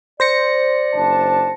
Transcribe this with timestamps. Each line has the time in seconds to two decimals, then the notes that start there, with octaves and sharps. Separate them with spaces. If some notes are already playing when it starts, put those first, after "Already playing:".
0.20 C5 D5 A#6 C#7
0.94 F#1 D4 A5